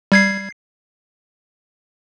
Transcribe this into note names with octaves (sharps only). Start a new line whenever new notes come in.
G3 G#6 C7